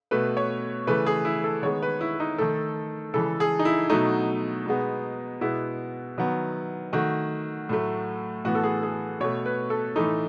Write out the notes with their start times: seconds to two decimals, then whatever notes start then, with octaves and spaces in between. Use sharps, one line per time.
0.11 B2 A3 B4
0.37 C#5
0.87 C#3 E3 A3 B4
1.06 G#4
1.25 E4
1.44 A4
1.63 D#3 G#3 B3 C#5
1.82 B4
2.01 E4
2.20 D#4
2.38 D#3 A3 A4
3.14 C#3 E3 G#3 A4
3.40 G#4
3.59 D#4
3.65 E4
3.90 B2 F#3 A3 D#4
4.66 B2 G#3 B3
5.41 B2 G#3 B3 E4
6.18 D#3 F#3 B3
6.93 D#3 A3 F#4
7.69 A2 F#3 A3
8.45 A2 E3 B3 F#4
8.55 A4
8.63 G#4
8.83 G#4
9.20 B2 A3 C#5
9.46 B4
9.70 A4
9.96 A2 E3 A3 D#4